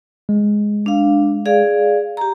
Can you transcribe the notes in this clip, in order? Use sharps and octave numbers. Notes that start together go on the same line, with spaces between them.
G#3
D4 F5
G#4 D5 F5
G4 A#5